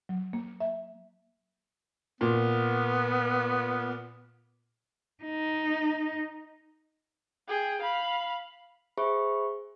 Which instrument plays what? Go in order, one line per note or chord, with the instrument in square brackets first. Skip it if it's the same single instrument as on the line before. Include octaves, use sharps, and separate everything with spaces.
[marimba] F#3
A#3
E5
[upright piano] A#2 [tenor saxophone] B3
[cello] D#4
[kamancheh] G#4 G5
F5 B5
[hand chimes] G#4 C5 E5 B5 C#6